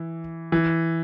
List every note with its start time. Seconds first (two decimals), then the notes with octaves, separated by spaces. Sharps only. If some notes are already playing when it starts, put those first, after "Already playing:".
Already playing: E3
0.52 E3